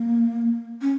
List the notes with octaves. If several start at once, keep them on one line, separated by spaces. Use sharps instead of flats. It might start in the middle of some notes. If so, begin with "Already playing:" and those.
Already playing: A#3
C#4